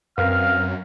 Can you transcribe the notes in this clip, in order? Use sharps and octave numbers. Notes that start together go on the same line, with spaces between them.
F#2 C4 A#4 B4 F5 F6